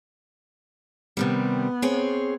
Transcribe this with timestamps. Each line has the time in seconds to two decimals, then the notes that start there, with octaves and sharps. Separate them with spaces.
1.17 C3 D#3 G3 B3
1.82 C4 G#4 C#5